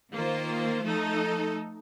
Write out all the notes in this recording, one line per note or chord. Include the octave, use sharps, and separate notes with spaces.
D#3 A#3 F4 C5
F3 A3 D#4 A4